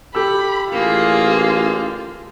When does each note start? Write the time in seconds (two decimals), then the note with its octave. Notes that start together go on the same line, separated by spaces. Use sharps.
0.15 G4 A4 B5 E6
0.73 A1 A#3 F4 G#4